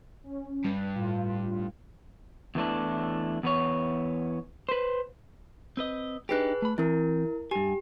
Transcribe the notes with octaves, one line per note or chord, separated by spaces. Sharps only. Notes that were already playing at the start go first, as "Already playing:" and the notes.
C#4
G2
A2 F4
E2 E3 A3 D4
E2 B3 C#5
B4 C5
C4 B4 D#5
D4 D#4 G4 G#4 B4 F#6
A3 B5
E3 C4 E4 A#4
G2 G4 G#5